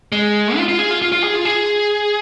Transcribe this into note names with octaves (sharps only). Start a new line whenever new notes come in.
G#3
F4
F4
G#4
F4
F4
F4
G#4
F4
G#4